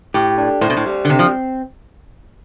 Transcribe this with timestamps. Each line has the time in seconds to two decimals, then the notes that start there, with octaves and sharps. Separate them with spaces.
0.14 A2 G4
0.38 D4
0.61 A2 C5
0.70 B2
0.77 A2
0.86 G3
1.05 D3
1.10 C3 C4
1.19 F3